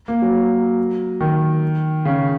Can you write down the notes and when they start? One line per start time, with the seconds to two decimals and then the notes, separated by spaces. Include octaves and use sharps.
0.08 A#3
0.22 F#3
1.21 D#3
2.05 C#3